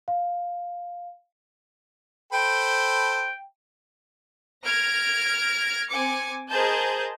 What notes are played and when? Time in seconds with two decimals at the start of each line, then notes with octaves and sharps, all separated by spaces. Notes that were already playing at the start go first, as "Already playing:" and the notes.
0.08 F5
2.33 A4 C5 G5 B5
4.65 F6 G#6 A#6 D7
5.90 C4 G#5 D6 C#7
6.50 G#4 A#4 C5 D#5 A5 G6